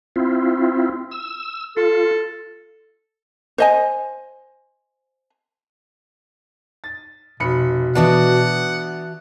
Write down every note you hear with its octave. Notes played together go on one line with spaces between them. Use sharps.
C4 E4 F4
E6
F4 A4
C5 D#5 G#5
A6
F1 B2 B5 C#7
E3 B3 D4 D#4 F#4 F#5 A5